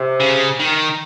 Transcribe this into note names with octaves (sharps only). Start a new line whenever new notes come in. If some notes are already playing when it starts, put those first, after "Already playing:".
Already playing: C3
C#3
D#3